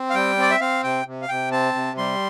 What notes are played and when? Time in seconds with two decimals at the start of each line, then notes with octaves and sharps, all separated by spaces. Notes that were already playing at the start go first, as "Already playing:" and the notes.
Already playing: C4
0.10 F5
0.14 G3 G5
0.38 C4 D5
0.51 E5
0.61 C4 F5
0.84 C3 G5
1.06 C3
1.22 F5
1.29 C3 G5
1.52 C4 A5
1.75 C3
1.98 G3 C6